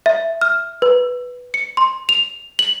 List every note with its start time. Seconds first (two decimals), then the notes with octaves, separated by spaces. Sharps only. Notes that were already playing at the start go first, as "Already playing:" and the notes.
0.06 E5
0.41 F6
0.82 B4
1.54 C#7
1.77 C6
2.09 F7
2.59 F#7